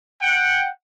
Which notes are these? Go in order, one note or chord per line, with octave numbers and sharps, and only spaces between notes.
F#5 G5